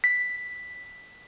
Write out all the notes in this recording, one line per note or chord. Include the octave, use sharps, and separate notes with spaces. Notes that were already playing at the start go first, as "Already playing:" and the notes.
B6